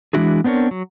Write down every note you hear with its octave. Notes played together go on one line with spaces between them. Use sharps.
E3 G#3 D4 E4 F#4 G#4
B3 C4 D4 A#4 C#5
F#3